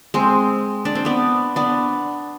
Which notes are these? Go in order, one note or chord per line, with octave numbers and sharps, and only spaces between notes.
G#3 C4
D4
C4
B3 D4
B3 D4